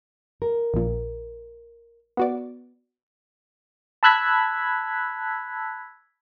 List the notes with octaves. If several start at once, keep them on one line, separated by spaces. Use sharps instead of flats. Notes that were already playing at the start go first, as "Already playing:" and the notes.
A#4
A#1 A#2
B3 F#4 D5
A5 B5 E6 F#6 G#6 B6